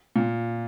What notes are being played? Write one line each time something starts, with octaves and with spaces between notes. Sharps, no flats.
A#2